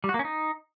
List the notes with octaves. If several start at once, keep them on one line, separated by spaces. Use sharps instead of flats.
G3
F#4
A#3
C#4
D#4